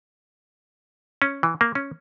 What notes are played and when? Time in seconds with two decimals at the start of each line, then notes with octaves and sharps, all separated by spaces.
1.22 C#4
1.43 E3
1.61 A#3
1.75 C#4